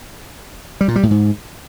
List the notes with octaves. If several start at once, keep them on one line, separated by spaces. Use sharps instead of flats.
G3
A#2
G3
A2
G#2